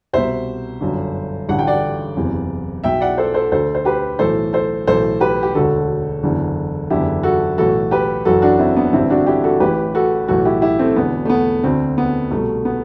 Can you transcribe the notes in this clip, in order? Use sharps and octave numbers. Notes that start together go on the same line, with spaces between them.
C2 B2 C5 E5
G1 F#2 D3
A1 G2 D3 F#5
G5
D5 F#5
F#1 E2 C3
B1 B2 E5 G5
D5 F#5
A4 C5
A4 C5
D2 D3 A4 C5
C5
G4 B4
B1 A2 E3 A4 C5
A4 C5
B1 A2 E3 A4 C5
G4 B4
G4
E1 D2 D3 F#4 A4
F#1 E2 D3
F#1 E2 D3 E4 G4
F#4 A4
B1 A2 E3 F#4 A4
G4 B4
F#1 F#2 E3 F#4 A4
D4 F#4
C4 E4
B3 D4
A1 G2 D3 C4 E4
D4 F#4
E4 G4
F#4 A4
A1 A2 E3 G4 B4
F#4 A4
B1 A2 E3 F#4 A4
E4 G4
E4 G4
A3 C4
E1 E2 D3 B3
A3
B3
D2 D3 A3 C4
B3
C2 B2 A3
B3